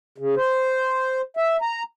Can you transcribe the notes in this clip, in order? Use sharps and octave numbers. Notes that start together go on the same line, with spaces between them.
C#3
C5
E5
A#5